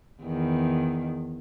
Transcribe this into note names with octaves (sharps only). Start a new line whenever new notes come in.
E2 D#3